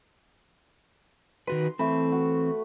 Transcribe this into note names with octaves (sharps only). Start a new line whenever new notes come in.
D#3 F#4 B4 C6
E3 A3 C4 B4
F#4